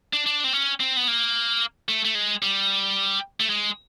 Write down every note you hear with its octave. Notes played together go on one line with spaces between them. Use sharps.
D4
D4
C4
C#4
C4
B3
A#3
A3
A3
G#3
G3
A3
G#3